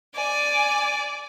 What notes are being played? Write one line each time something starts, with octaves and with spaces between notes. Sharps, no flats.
D5 G#5